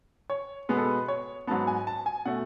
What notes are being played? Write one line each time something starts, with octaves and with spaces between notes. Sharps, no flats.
C#5
B2 G#3 B3 B4
A4
B4
C#5
G#2 F#3 B3 A5
G#5
A5
G#5
B2 A3 F#5